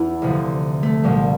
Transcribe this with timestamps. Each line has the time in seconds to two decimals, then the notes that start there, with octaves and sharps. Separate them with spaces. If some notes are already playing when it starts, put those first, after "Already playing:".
Already playing: E2 E3 E4
0.22 D2 C3 F3
0.83 A3
1.04 C2 A#2 F3 G3